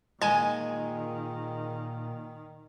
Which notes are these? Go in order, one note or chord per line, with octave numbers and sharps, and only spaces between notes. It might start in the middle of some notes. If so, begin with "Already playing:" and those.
A#2 D#3 G#3 G#5 G#6